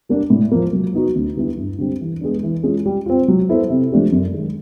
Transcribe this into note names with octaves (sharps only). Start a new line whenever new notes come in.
G3 A#3 D4
A2
F3 A#3
F#3
B3 D#4 F#4
D2
D3 G3 B3 E4
G2
D3 G3 C4
E3
G#3 B3 D4
E3
G#3 C#4 F4
G3
C4 F4
F#3
B3 E4 A4 C5
C3
F3 A3 D4 G4
F#2
D#3 G#3